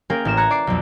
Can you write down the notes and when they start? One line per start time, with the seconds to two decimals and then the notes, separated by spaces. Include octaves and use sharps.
0.10 A#3 C#4 G#4 A#4 F5 G5
0.25 A1 A#4 F6 E7
0.37 A#5 F#6 G#6 C#7
0.50 D5 D6 C7
0.67 B1 F2